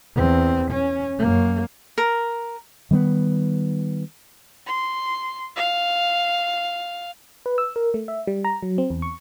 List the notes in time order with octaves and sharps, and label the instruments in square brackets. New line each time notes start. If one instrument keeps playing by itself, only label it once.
[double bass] E2 C4
C#4
F#2 A#3
[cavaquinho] A#4
[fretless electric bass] D#3 G3 A#3 B3
[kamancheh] C6
F5
[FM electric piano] B4
E6
A#4
A3
E5
G3
A#5
F#3
C4
E2
C#6